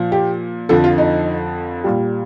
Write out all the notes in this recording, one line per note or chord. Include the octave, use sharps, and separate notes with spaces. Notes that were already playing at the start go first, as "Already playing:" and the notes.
Already playing: A#2 F3
G4
F2 D3 F3 A4
F4
D#4
A#2 G3